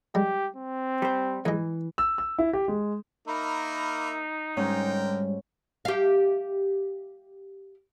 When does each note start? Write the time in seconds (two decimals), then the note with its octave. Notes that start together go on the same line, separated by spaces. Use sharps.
0.15 G3 G#3 G4
0.56 C4
1.02 G3 C5
1.45 G#2 E3 G#3
1.98 E6
2.18 E6
2.38 E4
2.53 G4
2.68 G#3
3.28 A#3 D#4 A#4 E5 B5
4.57 G#2 D3 G3 C#4 A#4 G5
5.85 G4 F5